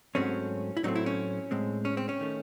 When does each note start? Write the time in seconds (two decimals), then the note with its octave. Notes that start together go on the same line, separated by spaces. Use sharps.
0.15 G#2 F#3 A3 C4 C#4
0.77 E4
0.83 A2 F#3 A3 C4 D#4
0.95 E4
1.06 C#4
1.51 A2 G#3 C4
1.85 C#4
1.97 C4
2.09 C#4
2.21 D#3 A3